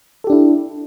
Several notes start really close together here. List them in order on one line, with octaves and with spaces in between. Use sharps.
A4 G4 D4 E4